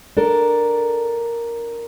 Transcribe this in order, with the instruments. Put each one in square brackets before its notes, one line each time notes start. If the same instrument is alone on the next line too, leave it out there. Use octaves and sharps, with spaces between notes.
[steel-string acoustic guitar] D4 A4 A#4